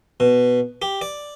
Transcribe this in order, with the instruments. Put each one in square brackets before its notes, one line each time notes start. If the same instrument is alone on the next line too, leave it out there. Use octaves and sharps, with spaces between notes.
[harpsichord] B2
G4
D5